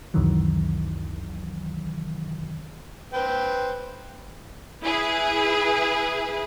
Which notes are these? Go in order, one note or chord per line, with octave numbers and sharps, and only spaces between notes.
C#2 F#2 C3 D#3 E3 F#3
B4 C5 G5
E4 G#4 B4